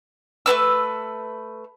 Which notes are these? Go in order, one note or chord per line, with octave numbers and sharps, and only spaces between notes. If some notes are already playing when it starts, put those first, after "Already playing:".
A3 B3 B4 E6